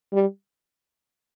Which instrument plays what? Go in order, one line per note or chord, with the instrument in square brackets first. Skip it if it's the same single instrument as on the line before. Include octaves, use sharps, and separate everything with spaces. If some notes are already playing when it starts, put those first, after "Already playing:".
[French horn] G3